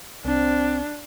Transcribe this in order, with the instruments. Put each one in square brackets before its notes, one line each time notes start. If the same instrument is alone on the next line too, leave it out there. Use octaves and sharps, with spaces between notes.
[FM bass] C2 [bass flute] C4 [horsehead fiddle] D4